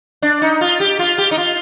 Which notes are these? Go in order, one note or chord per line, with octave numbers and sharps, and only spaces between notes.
D4
D#4
F4
G4
F4
G4
D#4
F4